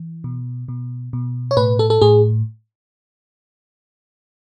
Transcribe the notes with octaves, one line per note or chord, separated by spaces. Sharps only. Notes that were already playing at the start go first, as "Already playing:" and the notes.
Already playing: E3
B2
B2
B2
C#5
A2 B4
A4
A4
A2 G#4